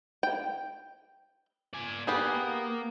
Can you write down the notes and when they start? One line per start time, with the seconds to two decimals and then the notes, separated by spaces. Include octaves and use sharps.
0.23 G5
1.73 D5 G#5
2.07 A#3 B3 G4 G#4